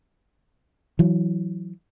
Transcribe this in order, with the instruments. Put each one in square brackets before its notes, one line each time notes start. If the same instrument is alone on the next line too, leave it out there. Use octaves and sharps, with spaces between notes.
[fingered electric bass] E3 F#3